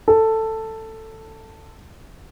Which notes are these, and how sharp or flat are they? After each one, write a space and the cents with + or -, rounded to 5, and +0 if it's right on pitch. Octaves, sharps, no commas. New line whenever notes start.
A4 +10